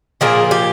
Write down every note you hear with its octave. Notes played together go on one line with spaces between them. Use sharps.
A#2 F3 A#3 G#4
G4